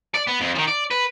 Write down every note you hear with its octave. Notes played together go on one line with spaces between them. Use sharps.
D5
B3
F2
D#3 F3
D5
B4